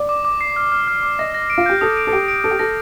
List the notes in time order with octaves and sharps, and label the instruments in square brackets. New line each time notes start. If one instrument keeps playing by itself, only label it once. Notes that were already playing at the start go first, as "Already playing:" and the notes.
Already playing: [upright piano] D5
[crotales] D6
D6
C7
F6
F6
F6
D6
[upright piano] D#5 [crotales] A#6
[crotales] A#6
D7
[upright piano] F4
[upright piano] G4 [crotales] G6
[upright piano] A4 [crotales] D#6
[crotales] D7
[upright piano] A4
[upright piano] G4 [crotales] D7
[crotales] D7
[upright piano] A4 [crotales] D7
[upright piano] G4
[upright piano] A4 [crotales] A#6